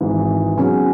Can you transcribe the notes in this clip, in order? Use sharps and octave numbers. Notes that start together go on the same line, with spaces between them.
G#1 G#2 E3
B2 F#3 C#4 G#4